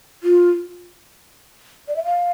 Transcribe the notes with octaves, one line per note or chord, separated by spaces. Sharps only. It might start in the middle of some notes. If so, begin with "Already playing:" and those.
F4
D5
E5
F5